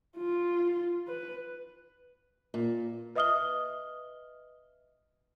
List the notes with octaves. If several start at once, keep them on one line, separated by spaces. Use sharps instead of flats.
F4
B4
A#2
B4 D#5 E5 D#6 F6 G7